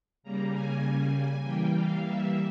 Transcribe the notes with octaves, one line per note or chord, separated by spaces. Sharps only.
C#3 G3 A#3 A#5
G#5
E3 G3 A#3 G5
F5
E5